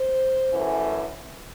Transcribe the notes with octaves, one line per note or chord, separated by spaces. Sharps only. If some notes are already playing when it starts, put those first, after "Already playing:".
Already playing: C5
F#2 E3 A3